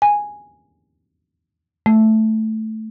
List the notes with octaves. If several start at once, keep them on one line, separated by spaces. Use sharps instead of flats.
G#5
A3